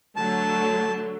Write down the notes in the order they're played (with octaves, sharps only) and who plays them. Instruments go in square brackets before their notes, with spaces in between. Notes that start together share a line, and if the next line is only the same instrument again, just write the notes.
[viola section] D3 F#3 A3 [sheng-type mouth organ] A5